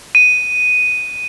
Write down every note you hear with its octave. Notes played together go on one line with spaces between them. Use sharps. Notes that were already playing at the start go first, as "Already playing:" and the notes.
D#7